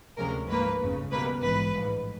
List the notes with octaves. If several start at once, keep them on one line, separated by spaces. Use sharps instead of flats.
D2 C3 F3 G#3 C#4 A#4
G#2 F3 A#3 B4
G1 F2 C#3
B2 G3 A#3 B4
A#1 G#2 E3 B4
A1 G#2 F3